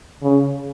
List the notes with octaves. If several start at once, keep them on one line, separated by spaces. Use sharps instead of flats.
C#3